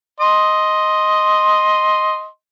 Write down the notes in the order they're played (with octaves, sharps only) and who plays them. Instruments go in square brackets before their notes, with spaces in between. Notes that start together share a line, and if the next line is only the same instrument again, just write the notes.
[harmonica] D#5 C6